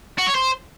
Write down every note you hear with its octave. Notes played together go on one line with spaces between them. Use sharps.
F#4
C#5
C5